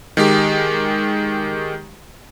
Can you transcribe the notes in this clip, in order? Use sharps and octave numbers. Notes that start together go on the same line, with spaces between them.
D#3 G#3 G4